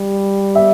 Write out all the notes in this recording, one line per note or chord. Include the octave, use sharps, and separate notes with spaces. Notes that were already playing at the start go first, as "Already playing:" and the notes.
Already playing: G3
E5